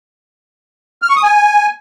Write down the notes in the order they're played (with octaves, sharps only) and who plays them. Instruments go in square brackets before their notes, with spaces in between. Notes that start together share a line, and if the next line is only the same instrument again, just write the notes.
[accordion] F6
C#6
D#6
G#5